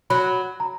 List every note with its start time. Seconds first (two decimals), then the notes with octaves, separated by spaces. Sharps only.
0.10 F#3 B5
0.60 A#5